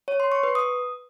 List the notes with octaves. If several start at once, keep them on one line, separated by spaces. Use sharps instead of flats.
C#5
C6
C#6
B4
D#6